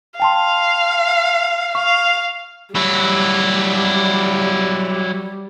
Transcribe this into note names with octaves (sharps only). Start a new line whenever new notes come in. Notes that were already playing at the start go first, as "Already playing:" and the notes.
F5 G5 A5 C6
F5 C#6
F#3 G3 E4